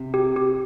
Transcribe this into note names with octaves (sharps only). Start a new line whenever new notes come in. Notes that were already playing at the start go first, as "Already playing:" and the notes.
Already playing: C3
G4
G4